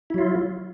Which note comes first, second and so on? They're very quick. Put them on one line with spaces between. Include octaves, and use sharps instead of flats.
E4 F#3 F4